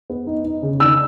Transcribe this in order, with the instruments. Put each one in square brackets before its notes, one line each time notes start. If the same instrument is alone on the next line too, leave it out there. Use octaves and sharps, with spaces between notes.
[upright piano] B3
D#4
D#4
C#3
D#3 E6